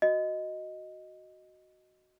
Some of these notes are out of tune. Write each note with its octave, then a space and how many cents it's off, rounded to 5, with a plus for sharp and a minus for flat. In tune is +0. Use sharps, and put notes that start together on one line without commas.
F#4 +0 D#5 +0